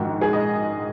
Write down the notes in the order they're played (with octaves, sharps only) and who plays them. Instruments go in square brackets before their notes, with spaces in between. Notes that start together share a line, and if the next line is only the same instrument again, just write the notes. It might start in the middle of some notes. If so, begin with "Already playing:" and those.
Already playing: [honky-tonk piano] A#1 G#2 D#3 F#4
G#4
D#5